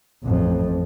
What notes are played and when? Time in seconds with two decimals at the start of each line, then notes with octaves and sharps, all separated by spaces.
0.24 A1 F2